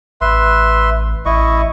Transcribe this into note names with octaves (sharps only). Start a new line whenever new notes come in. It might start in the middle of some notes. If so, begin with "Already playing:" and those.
A1 B4 E5 C6
A1 E4 D#5 C#6